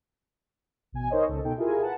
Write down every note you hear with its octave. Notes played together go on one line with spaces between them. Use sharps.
A1 B2 G#5
D#4 A#4 C5 C#5 D#5
C#2 A4
B2 D#4 A4 G5
E4 F4 G4 G#4 A#4 G#5
B4 F#5 A5